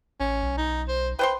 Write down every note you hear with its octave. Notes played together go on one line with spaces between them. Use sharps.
A1 C#4
B1
D#4
C5
B4 C5 G5 C6